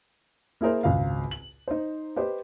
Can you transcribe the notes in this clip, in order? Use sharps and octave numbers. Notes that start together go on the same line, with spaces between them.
A#3 E4 G#4 A#4 C5
G#1 C#2 F5
F#7
D#4 C5
G4 B4 C5 D#5